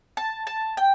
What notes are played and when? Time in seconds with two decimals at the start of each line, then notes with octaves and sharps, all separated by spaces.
0.17 A5
0.47 A5
0.77 G5